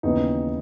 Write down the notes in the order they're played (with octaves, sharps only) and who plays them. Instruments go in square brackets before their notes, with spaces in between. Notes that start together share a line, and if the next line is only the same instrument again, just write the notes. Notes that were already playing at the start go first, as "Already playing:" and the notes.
[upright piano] D#2 C#3 E3 B3 D#4